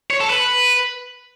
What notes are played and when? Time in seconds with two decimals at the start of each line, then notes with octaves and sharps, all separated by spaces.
0.10 C#5
0.20 A4
0.30 B4